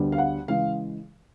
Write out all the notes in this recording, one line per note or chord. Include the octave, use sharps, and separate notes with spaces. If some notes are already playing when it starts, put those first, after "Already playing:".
Already playing: D2 D3 G3 B3 D4
F5
F#5
C#3 E3 G#3 F5